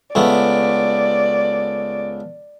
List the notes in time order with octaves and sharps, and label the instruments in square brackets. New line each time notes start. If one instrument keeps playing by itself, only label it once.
[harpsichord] C#2 A3 B3 [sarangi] D5